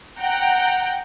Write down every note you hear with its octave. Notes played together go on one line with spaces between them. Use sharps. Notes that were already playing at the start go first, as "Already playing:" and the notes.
F#5 G5 A#5